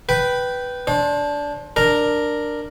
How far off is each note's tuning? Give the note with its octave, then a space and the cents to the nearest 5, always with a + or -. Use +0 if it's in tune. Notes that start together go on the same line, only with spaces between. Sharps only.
B4 +0 G5 -10 B5 +0
D4 -15 C5 +30
D4 +10 A#4 +0 A#5 +0